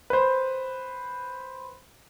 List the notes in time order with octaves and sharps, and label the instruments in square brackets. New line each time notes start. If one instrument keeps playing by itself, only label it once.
[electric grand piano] B4 C5